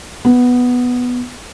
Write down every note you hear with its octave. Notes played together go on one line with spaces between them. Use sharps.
B3